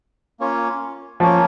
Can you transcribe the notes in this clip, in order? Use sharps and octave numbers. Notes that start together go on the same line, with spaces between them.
A#3 C#4 F4 C#5
F3 A#3 C#4 F4 C#5